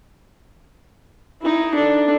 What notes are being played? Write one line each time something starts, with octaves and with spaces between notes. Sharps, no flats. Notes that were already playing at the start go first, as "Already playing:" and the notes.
D#4 E4
D4 A4